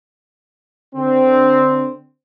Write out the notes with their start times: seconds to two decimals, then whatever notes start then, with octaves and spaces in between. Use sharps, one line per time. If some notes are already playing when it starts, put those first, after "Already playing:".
0.95 D3 C4